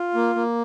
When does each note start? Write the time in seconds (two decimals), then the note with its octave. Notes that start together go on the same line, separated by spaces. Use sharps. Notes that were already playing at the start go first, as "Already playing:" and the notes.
Already playing: F4
0.15 A#3
0.35 A#3